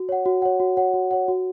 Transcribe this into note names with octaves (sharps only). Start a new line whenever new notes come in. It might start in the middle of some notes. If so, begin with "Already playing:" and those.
Already playing: F#4
C#5 F#5
F#4
C#5 F#5
F#4
C#5 F#5
F#4
C#5 F#5
F#4